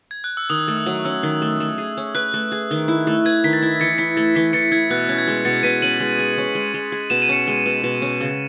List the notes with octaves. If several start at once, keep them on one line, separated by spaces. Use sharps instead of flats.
G#6
F#6
E6
D#3 D#6
A3
E6
F#3
C#4 E6
D#3
A3
A3
G#4
C#4
B4 F#6
A3
G#4
D#3
E4
A3
B4 G#6
D#3 B6
A6
E4
E3 A6 C#7
E4 B6
A3 A6
E3 B6
E3 A6 C#7
E4 G#6
B2 F#6
C#4
G#6
G#3
B2 A6 C#7
B2 B6 D#7
C#4 D#7 F#7
G#3
G#4
C#4
G#3
G#3
G#4
B2 E7
D#7
C#4 C#7 E7
G#3
B2
B2
C#4
C#3